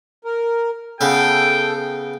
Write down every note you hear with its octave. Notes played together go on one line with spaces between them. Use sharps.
A#4
C#3 B3 A4 G5